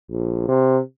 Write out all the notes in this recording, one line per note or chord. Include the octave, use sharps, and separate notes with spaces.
A#1
C3